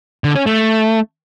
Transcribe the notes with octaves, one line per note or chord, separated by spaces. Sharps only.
D3
C#4
A3